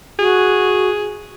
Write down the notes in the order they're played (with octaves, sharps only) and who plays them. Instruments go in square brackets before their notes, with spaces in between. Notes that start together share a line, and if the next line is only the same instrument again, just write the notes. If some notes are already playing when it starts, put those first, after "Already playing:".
[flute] F#4 [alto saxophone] G#4